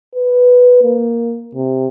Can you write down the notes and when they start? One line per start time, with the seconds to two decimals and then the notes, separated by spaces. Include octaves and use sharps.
0.16 B4
0.83 A#3
1.55 C3